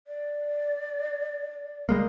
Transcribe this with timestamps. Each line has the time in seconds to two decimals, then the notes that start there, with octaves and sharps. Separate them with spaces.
0.07 D5
1.89 G3 G#3 A#3